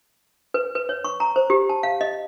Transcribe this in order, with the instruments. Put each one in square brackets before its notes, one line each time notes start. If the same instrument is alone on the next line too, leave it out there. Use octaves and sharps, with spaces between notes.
[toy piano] B4
B4
C#5
C#6
A#5
C5
G4
A5
F5
D#5